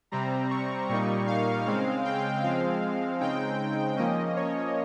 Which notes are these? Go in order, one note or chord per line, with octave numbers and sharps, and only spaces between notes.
C3 G3 C4 A#5
C#6
A#2 G3 A#3 D#4 C#6
F5
C#3 G#3 C4 F5
G5
F3 G#3 C4 F5
C#3 G#3 C4 D#4 G5
F3 A#3 C#4 D#5
C#5